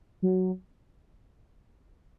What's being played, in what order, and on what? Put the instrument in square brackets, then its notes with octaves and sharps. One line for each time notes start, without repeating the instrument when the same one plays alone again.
[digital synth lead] F#3